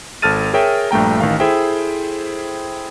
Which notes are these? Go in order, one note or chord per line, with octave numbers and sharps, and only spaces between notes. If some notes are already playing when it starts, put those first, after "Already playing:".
G#1 A4 A5 F6 A6 D#7
G#4 A#4 C#5 E5 G5
A#1 G2 A3 G5 A#5
A1 D#3 F5
E4 G#4 A4 C5 E5 G5